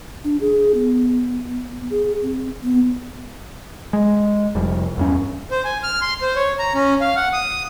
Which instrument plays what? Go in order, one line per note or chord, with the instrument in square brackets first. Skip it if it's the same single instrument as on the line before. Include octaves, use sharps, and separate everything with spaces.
[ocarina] D4
G#4
B3
G#4
C4
B3
[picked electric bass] G#3
F1 F2 G3
E2 G2 C#4
[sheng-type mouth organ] C5
G#5
F6
C6
C5
C#5
A#5
C#4
F5
F#5
D#6